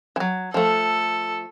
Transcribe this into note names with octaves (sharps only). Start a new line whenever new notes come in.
E3 F#3
F3 A3 A4